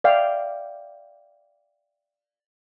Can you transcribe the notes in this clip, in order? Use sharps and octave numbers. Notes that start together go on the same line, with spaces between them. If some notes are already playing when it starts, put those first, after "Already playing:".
D5 E5 F5 G5